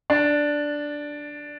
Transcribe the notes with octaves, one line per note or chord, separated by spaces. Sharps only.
D4